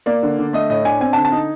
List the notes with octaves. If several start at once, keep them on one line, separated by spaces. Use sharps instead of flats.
A#3 D5
D3
D3
A3 D#5
A2 D#5
D4 G#5
C4 G#5
A5
D3
A5
D#4